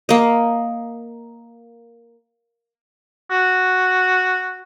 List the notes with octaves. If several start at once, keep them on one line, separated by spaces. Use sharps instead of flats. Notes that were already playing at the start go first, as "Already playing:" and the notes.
A#3 D#5
F#4